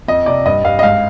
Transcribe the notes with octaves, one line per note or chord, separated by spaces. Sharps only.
F2 D#5
C3 D5
G2 D#5
G2 F5
D#5
G#2 F5